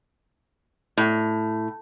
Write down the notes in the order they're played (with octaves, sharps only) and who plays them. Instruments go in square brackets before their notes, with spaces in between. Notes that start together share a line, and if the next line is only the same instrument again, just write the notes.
[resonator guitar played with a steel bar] A2